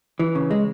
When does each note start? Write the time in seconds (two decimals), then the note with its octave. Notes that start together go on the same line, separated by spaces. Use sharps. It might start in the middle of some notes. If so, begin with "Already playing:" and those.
0.19 E3
0.35 C#3
0.51 G#3